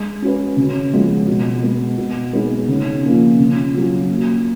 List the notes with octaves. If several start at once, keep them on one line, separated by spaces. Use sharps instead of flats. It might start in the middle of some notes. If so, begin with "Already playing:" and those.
Already playing: G#3
C#4 F#4 B4
C#3
F3 G#3 B3 F#4
B2
G#3 B3
B2
G#3 B3 D#4 G#4
C#3
F3 A#3 C#4
C#3
F#3 C#4 F4
A#3